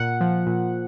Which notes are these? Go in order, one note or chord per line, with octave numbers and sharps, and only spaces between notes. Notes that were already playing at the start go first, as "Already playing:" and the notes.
Already playing: A#2 F#5
F3
A#2